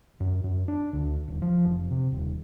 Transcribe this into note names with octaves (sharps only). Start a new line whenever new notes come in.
F#2
F#2
D4
D2
D#1
F3
F1
C3
D#1